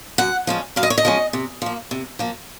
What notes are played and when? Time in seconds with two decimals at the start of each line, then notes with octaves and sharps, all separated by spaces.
0.18 F#2 F#5
0.47 F3 G#3 C#4
0.76 F#2 F5
0.83 D#5
0.90 C#5
0.98 D#5
1.05 F3 G#3 C#4
1.33 C3
1.62 F3 A#3
1.91 C3
2.19 F3 A#3